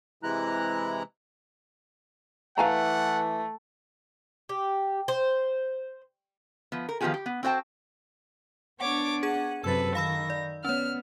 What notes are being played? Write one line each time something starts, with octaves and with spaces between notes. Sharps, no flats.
C3 E3 G#3 E4 A#5 F#6
E3 A3 F5 F#5 G#5 A#5
G4
C5
F3 B3
A#4
D#3 F3 B3 F4 G4 G#4
G4
B3
C4 F#4 C5 D5 G5 A5
B3 D4 C#5 F#5 D6
G#4 F#5 G#6 D#7
F#2 C3 A4 B4 E6 A6
D#3 F5 B5 E6 A#6
D5
B3 C#4 C#5 F6